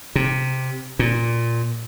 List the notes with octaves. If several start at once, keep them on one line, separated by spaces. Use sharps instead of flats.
C3
A#2